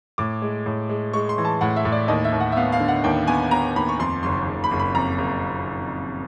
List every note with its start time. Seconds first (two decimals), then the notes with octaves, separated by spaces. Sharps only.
0.18 A2 D6
0.42 G#3
0.66 A2
0.89 G#3
1.13 G#3 C#6
1.29 C6
1.38 E3
1.45 A5
1.61 A2 F#5
1.76 E5
1.85 A2
1.92 D5
2.08 D#2 D#5
2.25 E5
2.32 D#2
2.40 F#5
2.52 E5
2.56 B3 F5
2.72 F5
2.80 D3
2.88 F#5
3.04 D#2 G5
3.27 B3 G#5
3.51 B3 A#5
3.76 D#2 B5
3.89 C#6
3.99 F2 C6
4.23 F#1 C6
4.47 F#1
4.64 B5
4.71 F#1
4.80 B5
4.95 F2 A#5
5.18 F#1